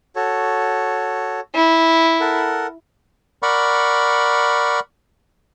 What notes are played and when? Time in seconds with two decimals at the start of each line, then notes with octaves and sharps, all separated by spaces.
0.16 F#4 A4 C#5
1.55 E4
2.20 A4 A#4 F#5
3.43 A#4 D5 F#5 B5 C#6